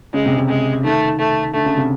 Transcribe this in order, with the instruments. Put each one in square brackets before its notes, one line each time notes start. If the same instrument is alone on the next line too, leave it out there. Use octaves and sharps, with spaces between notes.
[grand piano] C#3 [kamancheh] G#3
[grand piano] C3
C#3
[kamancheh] G#3
[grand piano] D#3 [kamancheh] A3
[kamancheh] A3
[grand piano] D3 [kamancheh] A3
[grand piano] C#3
C3